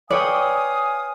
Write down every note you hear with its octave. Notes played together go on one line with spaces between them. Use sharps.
B4 C#5 D5 F5 G5 G#5 D#6